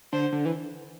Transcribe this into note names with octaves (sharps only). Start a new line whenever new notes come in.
D3 C5
D3
E3